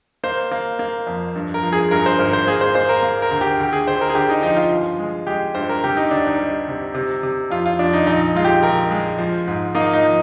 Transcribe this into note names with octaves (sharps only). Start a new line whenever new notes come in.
A#3 C5
A#3
A#3
F2
G2
A#4
F3
G#4
G2 A#4
C5
G#1 A#4
C5
A#3 G#4
C5
A#3 C5
A#4
A#3
A#4
D2
G4
D2 G4
G#4
D3 C5
A#4
G#4
D3 G4
D#4
F3 D#4
F4
G1
G#3
G#3 G4
G2 C5
A#4
C3 G4
D#4
D2 D4
D#4
G3
C3
C3
C3
F2 F4
F4
F2 D4
D#4
A#1 D#4
G#3 F4
G4
A#1 A#4
G#3
F3
G#2
A#3 D#4
D#4
F3